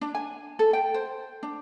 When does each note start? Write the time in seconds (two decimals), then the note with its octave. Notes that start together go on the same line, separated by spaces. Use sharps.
0.01 D4
0.15 G#5
0.59 A4
0.73 G5
0.94 C5
1.43 D4